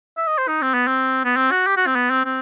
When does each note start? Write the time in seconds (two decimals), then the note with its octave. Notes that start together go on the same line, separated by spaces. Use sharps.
0.17 E5
0.27 D#5
0.38 C5
0.48 D#4
0.62 C4
0.74 B3
0.87 C4
1.25 B3
1.37 C4
1.51 F#4
1.67 G4
1.77 F#4
1.86 C4
1.95 B3
2.10 C4
2.25 C4